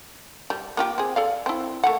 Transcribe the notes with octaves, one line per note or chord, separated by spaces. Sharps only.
G3
A#3 F4 G4
C4 G#4
A4 D5 F5
C4 E4
A3 A#3 F#5